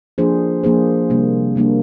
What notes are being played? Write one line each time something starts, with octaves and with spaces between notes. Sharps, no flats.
F3 A#3 D4 G#4 C5
F3 A#3 D4 G#4 C5
C3 G3 A#3 D4
C3 G3 A#3 D4